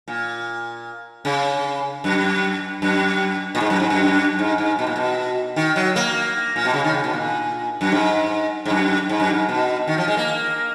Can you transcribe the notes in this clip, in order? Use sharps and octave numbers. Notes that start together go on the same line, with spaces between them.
A#2
C#3
F#2
F#2
A#2
G#2
F#2
G#2
F#2
G#2
G#2
B2
A#2
B2
D#3
F#3
A#3
A#2
B2
C#3
D#3
C#3
B2
A#2
F#2
G#2
G#2
F#2
G#2
F#2
G#2
B2
D#3
F3
G#3
A#3